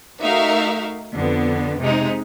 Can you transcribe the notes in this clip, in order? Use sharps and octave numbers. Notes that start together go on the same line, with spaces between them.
A3 D#4 F#4 A#4 E5 F5
F2 D3 B3
C3 G#3 D#4